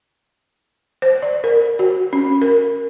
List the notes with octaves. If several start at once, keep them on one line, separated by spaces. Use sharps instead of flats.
C5
D5
A#4
F#4
C#4
A#4